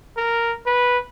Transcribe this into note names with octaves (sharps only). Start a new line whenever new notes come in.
A#4
B4